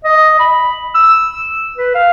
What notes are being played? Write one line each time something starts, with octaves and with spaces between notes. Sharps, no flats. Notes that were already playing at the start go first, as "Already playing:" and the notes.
D#5
B5
E6
B4
F5